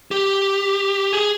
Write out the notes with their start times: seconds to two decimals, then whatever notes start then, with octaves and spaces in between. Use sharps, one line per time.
0.11 G4
1.13 G#4